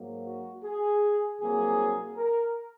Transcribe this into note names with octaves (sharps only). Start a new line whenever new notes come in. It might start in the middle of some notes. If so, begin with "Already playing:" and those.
Already playing: G#2 F#3 A#3
F#4
G#4
C2 C3 F#3 A#3 G#4
A#4